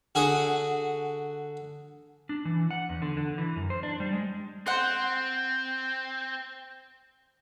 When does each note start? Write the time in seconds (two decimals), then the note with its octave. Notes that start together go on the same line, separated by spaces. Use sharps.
0.15 D3 F#4 G#4 D#6
2.29 D4
2.45 E3
2.71 F#5
2.89 E2
3.02 D3
3.17 D3
3.38 E3
3.56 F#2
3.70 C5
3.83 D4
4.00 G3
4.13 G#3
4.66 C4 C5 F#5